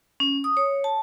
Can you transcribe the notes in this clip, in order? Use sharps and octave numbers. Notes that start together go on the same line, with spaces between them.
C#4
D#6
C#5
A5